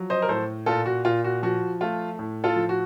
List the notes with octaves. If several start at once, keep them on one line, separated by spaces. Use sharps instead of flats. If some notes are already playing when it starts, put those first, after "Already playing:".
Already playing: F3 F#3
C5 D#5
A#4
A2 A4 C5
A#2 F4 A4
F#4
A#2 F4
F#4
F3 F#4
A3 F4
A2
F4 A4
F3
F#4